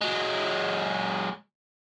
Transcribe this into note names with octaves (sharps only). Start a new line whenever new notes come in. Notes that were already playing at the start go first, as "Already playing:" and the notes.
F#3 G#3